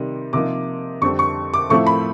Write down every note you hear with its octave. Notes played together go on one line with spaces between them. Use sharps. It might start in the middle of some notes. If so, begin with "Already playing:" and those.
Already playing: C3 D#3 G3
C3 F3 A#3 D#4 D6
F2 D3 G3 C4 C#6
C#6
D6
A2 F3 A3 C4 E4 C#6
B5